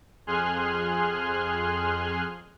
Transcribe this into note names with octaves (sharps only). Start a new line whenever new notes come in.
F2 G#4 G#5 C6 F6 F#6